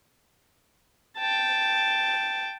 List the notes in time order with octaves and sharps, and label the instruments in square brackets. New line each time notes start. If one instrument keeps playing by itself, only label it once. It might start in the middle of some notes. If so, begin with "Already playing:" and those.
[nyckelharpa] G5 A5